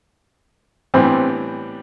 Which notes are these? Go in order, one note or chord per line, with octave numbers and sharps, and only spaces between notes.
A2 E3 G3 B3 C4 D4